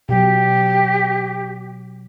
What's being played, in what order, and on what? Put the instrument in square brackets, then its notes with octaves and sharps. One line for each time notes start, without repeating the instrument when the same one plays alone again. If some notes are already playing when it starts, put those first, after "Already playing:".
[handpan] B2 F#3 [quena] G4